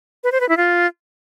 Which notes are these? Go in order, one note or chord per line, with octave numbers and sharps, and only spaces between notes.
B4
C5
B4
E4
F4